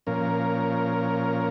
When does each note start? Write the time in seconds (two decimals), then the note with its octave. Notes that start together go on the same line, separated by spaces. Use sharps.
0.07 A#2 F3 C#4 A#4